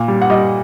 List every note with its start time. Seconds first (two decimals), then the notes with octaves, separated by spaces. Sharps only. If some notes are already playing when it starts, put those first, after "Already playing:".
Already playing: A#2
0.08 G3
0.22 F#5
0.30 G3 D#5